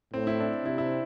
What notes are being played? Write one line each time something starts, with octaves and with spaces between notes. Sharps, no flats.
A2 C4
E4
D4
C3 E4
E4